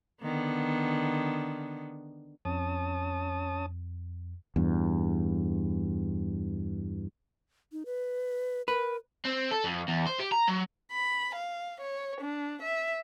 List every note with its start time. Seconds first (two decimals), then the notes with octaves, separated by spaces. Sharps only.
0.21 D3 D#3 B3
2.45 F2 C#4 A5 D#6
4.56 E2 G2
7.72 D#4
7.86 B4
8.68 A#4 B4
9.25 C4
9.51 A4
9.64 F2
9.88 E2
10.07 C5
10.19 G4
10.32 A#5
10.48 F#3
10.92 B5
11.35 F5
11.81 C#5
12.21 D4
12.62 E5